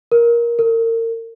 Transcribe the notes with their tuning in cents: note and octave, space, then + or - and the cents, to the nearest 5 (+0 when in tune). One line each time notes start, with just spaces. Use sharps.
A#4 +15
A#4 -35